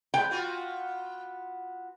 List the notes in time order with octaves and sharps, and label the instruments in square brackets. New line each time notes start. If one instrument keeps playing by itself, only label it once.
[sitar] C3 G#3 B4 [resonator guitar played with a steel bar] G5
[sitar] B3 F4 F#4